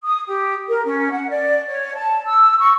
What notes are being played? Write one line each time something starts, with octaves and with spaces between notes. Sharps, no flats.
D#6
G4
A#4
C#4
F#5
D5
C#5
A5
E6
C#6